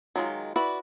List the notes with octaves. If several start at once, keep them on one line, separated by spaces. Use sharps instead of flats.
D#3 F#3 G#3 F4
E4 F#4 B4 D5